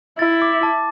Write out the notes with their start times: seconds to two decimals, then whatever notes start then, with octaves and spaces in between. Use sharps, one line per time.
0.19 E4 A6
0.42 D6
0.63 A5